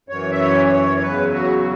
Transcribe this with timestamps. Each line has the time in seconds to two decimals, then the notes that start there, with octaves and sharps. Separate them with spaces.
0.09 F#2 E3 C#5
0.32 E5
0.41 C#5
0.72 C#5
0.97 C#5
1.02 E2 C#3 F#3 B4
1.33 F#4